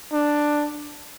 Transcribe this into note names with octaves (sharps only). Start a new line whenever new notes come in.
D4